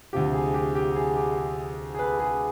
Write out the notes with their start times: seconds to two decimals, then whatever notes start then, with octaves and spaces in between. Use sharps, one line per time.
0.13 D2 C3 F3 G4
0.33 G#4
0.54 G4
0.75 G4
0.96 G#4
1.16 G4
1.37 G#4
1.95 G#4
1.99 B4
2.20 G#4